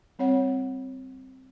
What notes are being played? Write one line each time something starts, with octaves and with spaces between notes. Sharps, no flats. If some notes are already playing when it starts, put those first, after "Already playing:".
G3 C4 C#5 F#5